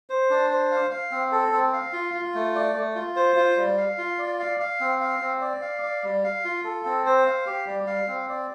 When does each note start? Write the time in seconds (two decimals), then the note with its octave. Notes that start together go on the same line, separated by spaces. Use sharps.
0.10 C5
0.30 D4
0.50 C5
0.71 F5
0.91 F5
1.11 C4
1.32 A4
1.52 C4
1.73 F5
1.93 F4
2.14 F4
2.35 A3
2.55 D5
2.75 A3
2.95 F4
3.16 C5
3.36 F4
3.57 G3
3.78 F5
3.98 F4
4.19 D5
4.39 F5
4.60 F5
4.80 C4
5.01 F5
5.21 C4
5.41 D5
5.61 F5
5.82 D5
6.04 G3
6.24 F5
6.44 F4
6.64 A4
6.85 C4
7.06 C5
7.26 F5
7.46 G4
7.66 G3
7.87 F5
8.08 C4
8.29 D5